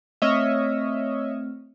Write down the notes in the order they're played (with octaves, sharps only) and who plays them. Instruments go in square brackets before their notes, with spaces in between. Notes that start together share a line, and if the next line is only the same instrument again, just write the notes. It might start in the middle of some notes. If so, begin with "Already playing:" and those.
[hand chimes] A3 C4 F6 [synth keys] C#5 D#5 E5